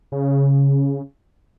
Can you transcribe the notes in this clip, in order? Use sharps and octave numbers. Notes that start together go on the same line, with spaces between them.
C#3